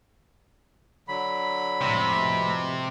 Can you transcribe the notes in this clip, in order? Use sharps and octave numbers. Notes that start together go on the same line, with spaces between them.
D3 F#3 B5
F2 A2 C3 G#3
B2